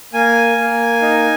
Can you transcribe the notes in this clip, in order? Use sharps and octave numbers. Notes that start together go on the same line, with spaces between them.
A#3 G#5
A#3
D#4